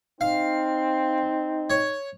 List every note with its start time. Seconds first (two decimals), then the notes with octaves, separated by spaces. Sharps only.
0.21 C4 D#4 F5
1.70 C#5